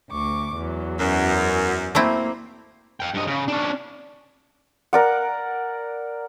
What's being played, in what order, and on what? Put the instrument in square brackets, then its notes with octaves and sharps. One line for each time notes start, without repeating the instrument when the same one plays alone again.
[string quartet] D2 C#6 D6
E2 F#3
[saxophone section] F#2
[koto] A3 C4 E4 [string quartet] A#3
[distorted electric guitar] F5 G5
G2 D#5
C#3
C#4 D4
[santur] A#4 D5 F#5